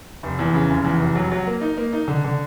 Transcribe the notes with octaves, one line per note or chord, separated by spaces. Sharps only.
F1
E2
C#3
F1
E2
F1
F#3
F#3
A#3
D#4
A#3
D#4
D3
D3